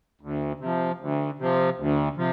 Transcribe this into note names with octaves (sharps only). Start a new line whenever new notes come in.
D2
C3 F3
D2
C3 F3
D2
C3 F3